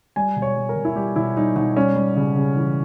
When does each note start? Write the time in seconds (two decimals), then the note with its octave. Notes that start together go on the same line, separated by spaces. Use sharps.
0.16 G3 G#5
0.36 B2
0.42 C#5
0.56 G3
0.69 A#4
0.75 B2
0.85 E4
0.96 G3 G4
1.16 B2 E4
1.36 G3 D#4
1.56 B2 D#4
1.76 G3 C#4
1.96 G3
2.16 C#3
2.36 C#3
2.56 E3